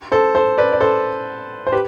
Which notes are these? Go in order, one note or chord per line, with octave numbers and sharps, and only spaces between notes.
A4 C5
A4 C5
B4 D5
D5
A4 C5
C5
G4 B4